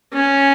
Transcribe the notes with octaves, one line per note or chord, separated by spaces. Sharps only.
C#4